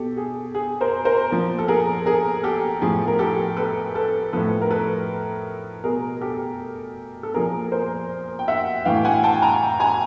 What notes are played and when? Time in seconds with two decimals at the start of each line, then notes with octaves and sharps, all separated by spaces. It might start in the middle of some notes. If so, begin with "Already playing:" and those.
Already playing: B2 G4 A4
0.17 G#4
0.55 G#4
0.81 A#4 C5
1.05 A#4 C5
1.31 A#2 F3
1.59 A4
1.68 G#4 A#4
2.06 G#4 A#4
2.44 G4 A4
2.82 A2 F3 G#4
3.08 A#4
3.19 G4 A4
3.57 A4 B4
3.95 A4 B4
4.33 A2 F3 A4 B4
4.61 A#4
4.71 A4 B4
5.83 B2 G#4 A#4
6.21 G4 A4
7.23 A4
7.34 A#2 F3 G#4 A#4
7.72 A#4 C5
8.39 G5
8.48 E5 F#5
8.85 A2 E3 F5 G5
8.97 G5
9.05 F#5 G#5
9.23 G5 A5
9.42 G#5 A#5
9.80 G#5 A#5